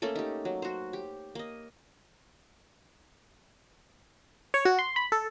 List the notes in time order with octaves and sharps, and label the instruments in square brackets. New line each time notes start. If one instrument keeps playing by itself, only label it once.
[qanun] A3 A#3 C#4 A4
D#4 G4
F#3
F#4 C5
G4
A#3 D#5
[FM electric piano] C#5
F#4
C6
B5
A4